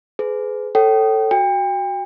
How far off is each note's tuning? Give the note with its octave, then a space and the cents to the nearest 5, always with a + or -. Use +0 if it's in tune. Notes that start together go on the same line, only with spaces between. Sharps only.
G#4 +25 B4 +35
A4 +10 C#5 -15 G5 -30
F#4 +0 G5 +35